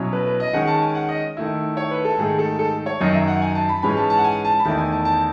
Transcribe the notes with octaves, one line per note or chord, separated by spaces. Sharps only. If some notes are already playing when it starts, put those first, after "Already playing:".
Already playing: B2 F#3 C#4 E4
B4
B4
D#5
D#3 G#3 C#4 F#5
A5
G#5
F#5
D#5
D#3 A3 E4
C#5
B4
A4
G#2 D#3 A3 G#4
A4
A4
C#5
F#2 D#3 F#3 D#5
E5
F#5
G#5
A5
B5
G#2 E3 G#3 C#4 B5
A5
A5
F#5
G#5
A5
B5
E2 D#3 A3 E4 A5
G#5
A5
A5